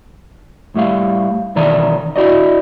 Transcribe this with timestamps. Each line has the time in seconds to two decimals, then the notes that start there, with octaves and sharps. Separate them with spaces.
0.75 A2 G3 E5 F5
1.56 B2 D#3 E3 D5 E5 A#5
2.16 E4 F#4 D5 D#5